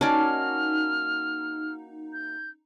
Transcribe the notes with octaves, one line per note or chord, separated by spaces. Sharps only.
A#3 C#4 D#4 F#4 D5 A5 F6
G6